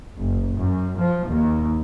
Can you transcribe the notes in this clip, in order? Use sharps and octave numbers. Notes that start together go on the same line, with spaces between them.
F#1
F#2
F3
D#2